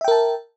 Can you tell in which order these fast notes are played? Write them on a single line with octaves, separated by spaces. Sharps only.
E5 G5 A#4 A5